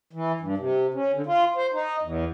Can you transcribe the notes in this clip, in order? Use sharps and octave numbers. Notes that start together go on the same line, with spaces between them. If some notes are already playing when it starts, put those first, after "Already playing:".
E3
G2
C3
C#4
D3
F4
C5
D#4
E2